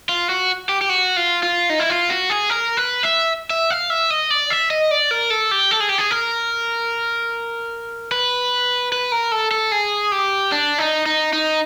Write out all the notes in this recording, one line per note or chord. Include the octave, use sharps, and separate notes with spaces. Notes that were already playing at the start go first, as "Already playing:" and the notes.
F4
F#4
G4
G4
F#4
F4
F4
D#4
E4
F4
F#4
G#4
A#4
B4
E5
E5
F5
E5
D#5
D5
E5
D#5
D5
A#4
A4
G4
A4
G#4
G4
G#4
A#4
B4
B4
A#4
A4
A4
G#4
G4
D4
D#4
D#4
D#4